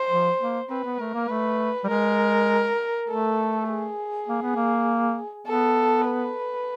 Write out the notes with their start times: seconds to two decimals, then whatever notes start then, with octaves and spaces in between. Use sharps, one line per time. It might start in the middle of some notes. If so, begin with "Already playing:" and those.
Already playing: C5
0.10 F3
0.39 A#3
0.69 C4 B4
0.84 B3
0.99 A3 A#4
1.14 A#3
1.29 A3 B4
1.84 G3
1.89 G#3 A#4
3.08 A3 A4
3.68 G#4
4.28 A#3
4.42 B3
4.56 A#3
5.47 B3 A4
6.06 B4